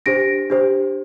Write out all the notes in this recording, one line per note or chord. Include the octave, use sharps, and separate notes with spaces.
D4 G4 C5 A#6 D7
D4 G4 C5